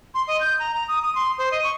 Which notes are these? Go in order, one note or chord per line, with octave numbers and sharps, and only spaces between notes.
C6
D#5
G6
A#5
A#5
D#6
D#6
C6
C5
D#5
C#6